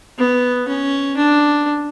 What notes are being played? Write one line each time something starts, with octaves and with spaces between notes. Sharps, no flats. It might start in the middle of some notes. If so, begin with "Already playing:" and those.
B3
C#4
D4